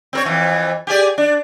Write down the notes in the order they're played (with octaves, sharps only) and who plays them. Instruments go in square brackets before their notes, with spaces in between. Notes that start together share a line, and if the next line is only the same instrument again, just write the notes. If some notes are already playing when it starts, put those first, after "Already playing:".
[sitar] C4 A#4 C#5
F2 E3
G4 G#4 D5
D4